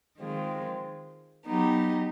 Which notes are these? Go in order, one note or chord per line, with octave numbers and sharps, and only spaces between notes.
D#3 G#3 C4 F4
F#3 B3 D#4 G4